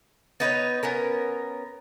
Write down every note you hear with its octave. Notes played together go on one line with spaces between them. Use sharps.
B3 D#4 B4 C#5
B3 C#4 A#4